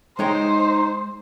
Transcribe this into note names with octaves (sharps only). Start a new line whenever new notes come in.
G#3 D#4 C5 C#5 G5